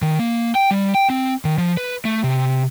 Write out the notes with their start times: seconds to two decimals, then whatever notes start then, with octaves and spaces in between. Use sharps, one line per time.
0.02 D#3
0.20 A#3
0.55 G5
0.71 G3
0.95 G5
1.10 C4
1.45 D#3
1.58 F3
1.77 B4
2.05 A3
2.24 C3